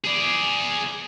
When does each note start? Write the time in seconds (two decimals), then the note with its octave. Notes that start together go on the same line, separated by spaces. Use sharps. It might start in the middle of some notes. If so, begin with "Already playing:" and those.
0.05 G#4 D5